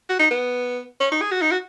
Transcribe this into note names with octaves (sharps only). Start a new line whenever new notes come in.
F#4
D#4
B3
C#4
D#4
G#4
F#4
D#4
F#4